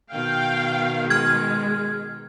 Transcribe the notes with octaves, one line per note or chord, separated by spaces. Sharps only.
B2 D#3 F5 G5
G#3 F6 G#6